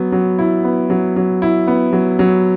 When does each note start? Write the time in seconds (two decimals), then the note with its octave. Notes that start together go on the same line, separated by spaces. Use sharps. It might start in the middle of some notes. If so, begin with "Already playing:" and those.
Already playing: F#3 B3
0.12 F#3
0.39 E4
0.64 B3
0.90 F#3
1.16 F#3
1.42 E4
1.67 B3
1.93 F#3
2.19 F#3